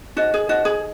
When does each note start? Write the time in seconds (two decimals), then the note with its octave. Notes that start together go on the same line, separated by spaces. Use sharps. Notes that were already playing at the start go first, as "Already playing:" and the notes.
0.17 D#4 F#4 G#4 C5 D#5
0.34 G#4
0.49 D#4 F#4 G#4 C5 D#5
0.65 G#4